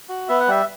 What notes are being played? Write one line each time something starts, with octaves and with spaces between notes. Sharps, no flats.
F#4
B3 E5
F#5
G3 E5